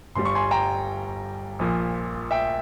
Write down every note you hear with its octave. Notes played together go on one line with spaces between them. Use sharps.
G1 G2 G3 C6
C#6
G#5 C6
G5 A#5
A#1 A#2 F3
E5 G5